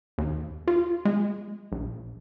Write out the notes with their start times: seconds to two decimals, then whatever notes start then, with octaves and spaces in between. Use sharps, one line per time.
0.18 D#2
0.67 F4
1.05 G#3
1.72 A#1